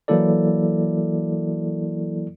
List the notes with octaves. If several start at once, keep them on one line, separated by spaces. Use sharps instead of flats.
E3 F#3 A#3 E4 A4 D5